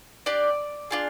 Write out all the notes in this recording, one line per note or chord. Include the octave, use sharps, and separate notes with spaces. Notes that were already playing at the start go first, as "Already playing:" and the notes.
D4 G4 D5
D4 F4 G#4